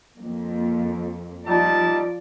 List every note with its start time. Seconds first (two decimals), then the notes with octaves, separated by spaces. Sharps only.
0.16 F2 A#3
1.46 F3 G3 D#4 F4 D5 A5